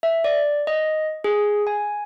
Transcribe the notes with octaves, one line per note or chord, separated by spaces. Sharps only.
E5
D5
D#5
G#4
G#5